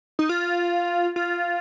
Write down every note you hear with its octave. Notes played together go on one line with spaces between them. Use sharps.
D#4
F4
F4